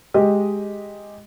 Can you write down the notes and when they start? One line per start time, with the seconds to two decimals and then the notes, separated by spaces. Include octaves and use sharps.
0.14 G#3 G4 D#5